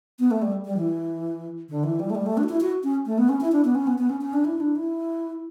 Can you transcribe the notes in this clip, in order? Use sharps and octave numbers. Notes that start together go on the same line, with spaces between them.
B3
A3
G3
G3
E3
D3
E3
G3
A3
G3
A3
D4
F#4
E4
F#4
C#4
A3
B3
C#4
E4
D4
B3
C#4
B3
B3
C#4
C#4
D4
E4
D4
E4